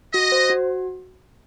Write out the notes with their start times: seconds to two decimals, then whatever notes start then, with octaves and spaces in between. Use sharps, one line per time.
0.14 F#4 D#5
0.32 C5
0.50 F#4